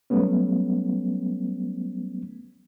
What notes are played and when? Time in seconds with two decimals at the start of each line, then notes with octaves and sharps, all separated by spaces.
0.10 F#3 G3 A3 B3 C#4